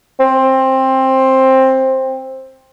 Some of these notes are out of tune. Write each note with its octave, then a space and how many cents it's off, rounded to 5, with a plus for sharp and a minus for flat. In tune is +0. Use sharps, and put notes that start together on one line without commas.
C4 +15